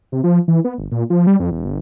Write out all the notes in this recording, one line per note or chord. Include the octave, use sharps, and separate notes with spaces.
C3
F3
E3
B3
G1
A#2
F3
G3
F2
E1
G1